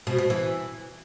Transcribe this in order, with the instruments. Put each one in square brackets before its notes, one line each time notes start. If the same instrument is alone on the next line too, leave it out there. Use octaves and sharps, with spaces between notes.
[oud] B2
B2
E3